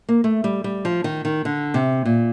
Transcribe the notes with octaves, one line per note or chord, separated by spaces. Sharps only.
A#3
A3
G3
G3
F3
D#3
D#3
D3
C3
A#2